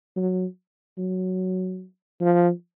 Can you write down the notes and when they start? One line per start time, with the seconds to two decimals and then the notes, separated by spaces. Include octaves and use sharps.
0.16 F#3
0.98 F#3
2.21 F3